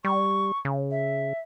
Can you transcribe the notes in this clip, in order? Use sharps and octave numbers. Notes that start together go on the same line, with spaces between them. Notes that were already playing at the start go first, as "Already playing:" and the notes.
G3 C#6
C#3
E5